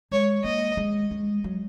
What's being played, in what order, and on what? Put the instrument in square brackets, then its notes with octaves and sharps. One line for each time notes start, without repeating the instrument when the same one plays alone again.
[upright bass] G#3 [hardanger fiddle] C#5
[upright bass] A#3 [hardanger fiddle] D#5
[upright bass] G#3
G#3
F#3